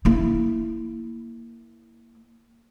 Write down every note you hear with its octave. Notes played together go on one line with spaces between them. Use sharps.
A#3 E4